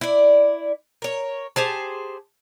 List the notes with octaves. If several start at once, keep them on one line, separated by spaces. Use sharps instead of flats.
E4 D5
A#4 C#5
G4 G#4 C5 A5